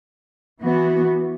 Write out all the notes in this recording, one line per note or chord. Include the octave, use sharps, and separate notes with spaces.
E3 B3 F#4